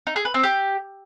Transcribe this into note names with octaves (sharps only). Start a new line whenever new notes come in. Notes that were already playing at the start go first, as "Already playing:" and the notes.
D#4
G#4
B4
C4
G4